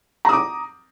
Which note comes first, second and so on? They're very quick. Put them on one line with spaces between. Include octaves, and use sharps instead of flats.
A#5 D#6 D6